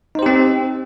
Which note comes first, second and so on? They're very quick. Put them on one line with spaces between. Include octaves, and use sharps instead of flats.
D#4 C5 G4 C4